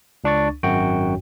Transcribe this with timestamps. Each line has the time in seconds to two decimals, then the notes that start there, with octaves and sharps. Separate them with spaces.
0.24 C#2 D4 C#6 A6
0.63 G#1 F#2 F#4 G5